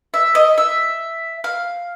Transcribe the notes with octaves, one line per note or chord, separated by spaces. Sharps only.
E5
D#5
E5
F5